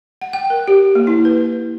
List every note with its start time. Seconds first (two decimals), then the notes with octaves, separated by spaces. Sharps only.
0.21 F#5
0.33 G5
0.50 A#4
0.68 G4
0.95 A#3
1.07 E4
1.25 B4